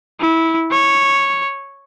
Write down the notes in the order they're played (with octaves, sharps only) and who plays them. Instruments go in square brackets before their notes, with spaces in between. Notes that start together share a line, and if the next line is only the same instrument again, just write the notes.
[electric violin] E4
C#5